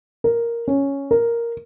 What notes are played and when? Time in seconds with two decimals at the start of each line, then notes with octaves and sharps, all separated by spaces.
0.24 A#4
0.68 C#4
1.11 A#4